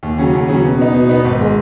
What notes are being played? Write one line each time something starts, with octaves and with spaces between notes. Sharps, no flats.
D#2
C#3 F#3 C#4
D#2
C#3 F#3 C#4
B2
B3 D#4
B2
B3 D#4
G#1
G#3